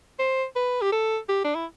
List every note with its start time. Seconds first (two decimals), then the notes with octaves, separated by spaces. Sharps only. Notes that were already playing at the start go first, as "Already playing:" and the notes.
0.19 C5
0.56 B4
0.81 G4
0.92 A4
1.29 G4
1.44 D4
1.55 E4